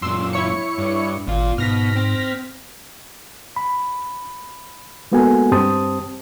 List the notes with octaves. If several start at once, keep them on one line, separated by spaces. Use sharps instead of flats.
F#2 A#2 C6 E6
E4 C#5 C#7
G2
G#1 A#2 F4
G#2 B2 F6 A#6 B6
C4
B5
G#3 A#3 B3 F#4 A4 G#5
G2 C4 G4 C5 A5 D#6